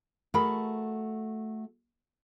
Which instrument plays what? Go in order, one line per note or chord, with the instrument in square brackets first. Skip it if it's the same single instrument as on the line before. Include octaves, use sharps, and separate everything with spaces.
[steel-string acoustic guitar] A3 F#4 [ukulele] G#4 A#4 B5